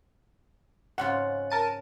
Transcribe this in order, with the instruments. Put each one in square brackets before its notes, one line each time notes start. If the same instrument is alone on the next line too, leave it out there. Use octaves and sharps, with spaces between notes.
[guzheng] G#2 C#3 F4 [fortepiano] F#5
[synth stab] A#4 A5 D#7